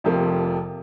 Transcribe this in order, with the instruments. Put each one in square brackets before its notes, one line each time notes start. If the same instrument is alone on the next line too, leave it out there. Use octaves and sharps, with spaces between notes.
[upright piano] F1 F2 C3 F3 A#3